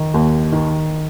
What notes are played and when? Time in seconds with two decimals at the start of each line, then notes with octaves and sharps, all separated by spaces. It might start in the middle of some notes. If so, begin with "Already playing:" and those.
Already playing: D#3
0.14 D#2
0.52 D#3